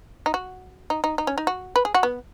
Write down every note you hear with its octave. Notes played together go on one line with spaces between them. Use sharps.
D#4
F#4
D#4
D#4
D#4
C#4
D#4
F#4
B4
G#4
F#4
B3